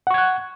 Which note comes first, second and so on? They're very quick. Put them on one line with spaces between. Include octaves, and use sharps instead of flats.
F#5 C#6 G#6 F#6